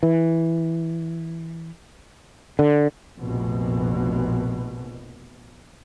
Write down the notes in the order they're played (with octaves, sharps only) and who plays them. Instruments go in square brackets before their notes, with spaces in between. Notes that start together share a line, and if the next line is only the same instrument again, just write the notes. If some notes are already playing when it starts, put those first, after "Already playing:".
[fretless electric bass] E3
D3
[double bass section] F1 A#1 B2